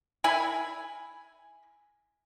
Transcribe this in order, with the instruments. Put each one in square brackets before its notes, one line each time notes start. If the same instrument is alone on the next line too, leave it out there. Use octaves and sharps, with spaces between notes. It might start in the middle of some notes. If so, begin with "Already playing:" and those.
[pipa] E4 G#5 B5